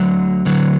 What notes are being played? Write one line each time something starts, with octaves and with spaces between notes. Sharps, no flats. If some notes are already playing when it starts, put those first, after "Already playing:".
Already playing: D2 D3 F#3
D2 D3 F#3